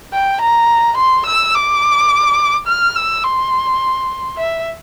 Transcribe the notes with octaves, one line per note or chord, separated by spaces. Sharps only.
G5
A#5
C6
E6
D6
F6
E6
C6
E5